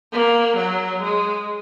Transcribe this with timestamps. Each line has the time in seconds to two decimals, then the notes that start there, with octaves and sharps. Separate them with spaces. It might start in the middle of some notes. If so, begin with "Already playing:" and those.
0.12 A#3
0.57 F#3
1.02 G#3